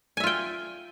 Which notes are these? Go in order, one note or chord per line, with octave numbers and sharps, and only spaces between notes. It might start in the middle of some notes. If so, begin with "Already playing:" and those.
F4 E5 G5 G#5